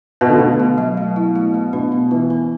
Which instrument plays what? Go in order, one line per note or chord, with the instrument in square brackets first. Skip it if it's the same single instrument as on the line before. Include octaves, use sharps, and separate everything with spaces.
[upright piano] B2 [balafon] B4
[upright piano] D3
[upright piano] B2 [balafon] A3
[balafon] A3
F#3
A3
E4
A3
A3
[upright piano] B2 [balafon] D4
[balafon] B3
[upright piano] E3 [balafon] B3
[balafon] B3